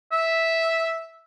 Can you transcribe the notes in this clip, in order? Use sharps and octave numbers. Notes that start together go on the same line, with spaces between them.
E5